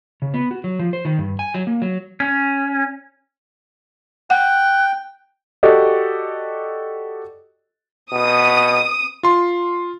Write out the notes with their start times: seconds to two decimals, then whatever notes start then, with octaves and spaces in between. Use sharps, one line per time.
0.22 C#3
0.34 B3
0.51 F#4
0.64 F#3
0.79 F3
0.93 C5
1.05 D#3
1.19 G2
1.39 G#5
1.54 F#3
1.67 A#3
1.82 F#3
2.20 C#4
4.30 F#5 G5 F#6
5.63 F#4 G4 A4 D5 D#5
8.12 B2 D#6
9.23 F4 C6